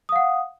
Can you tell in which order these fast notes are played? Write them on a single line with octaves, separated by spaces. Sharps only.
D#6 F5 F#5